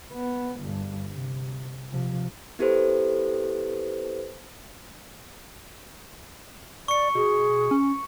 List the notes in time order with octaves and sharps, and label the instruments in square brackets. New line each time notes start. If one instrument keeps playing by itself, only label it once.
[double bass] B3
G1 G2
C3
C3 F3
[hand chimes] B3 E4 G4 A4 B4 C5
[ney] D5 [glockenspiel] C#6 C#7
[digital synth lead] B2 [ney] G#4
[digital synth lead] C#4